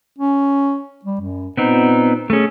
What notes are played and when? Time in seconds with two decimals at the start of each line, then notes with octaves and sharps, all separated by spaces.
0.18 C#4
1.05 G3
1.21 F#2
1.57 A#2 B3 C4 D#4
2.30 A3 C#4 G#4